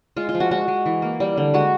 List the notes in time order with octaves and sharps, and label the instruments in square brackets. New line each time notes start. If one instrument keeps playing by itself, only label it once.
[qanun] G#3 F4
F4
F3
F#4
G#3 F#4
G#3
E3
A#3
G3
D3
G#3 F#4